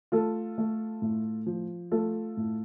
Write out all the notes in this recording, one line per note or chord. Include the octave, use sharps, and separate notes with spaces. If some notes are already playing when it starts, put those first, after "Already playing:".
A3 F4 A4
A3
A2
F3
A3 F4 A4
A2